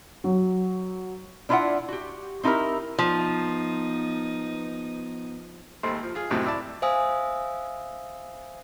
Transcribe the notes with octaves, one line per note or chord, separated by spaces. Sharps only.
F#3
D4 E4 F4 D5 E5 F#5
F#4 G4
C4 D#4 E4 G4 A#4
F3 B3 D#4
G#1 D#2 G3 A3 C5 C6
F3
F4 G#4
G#1 F#2 A2 C3 F#3 A5
E4 D5 A5
C5 E5 F5 G#5 D#6 E6